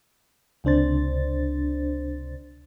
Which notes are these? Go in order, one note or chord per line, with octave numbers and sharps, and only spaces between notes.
C#2 C3 D4 C5 A6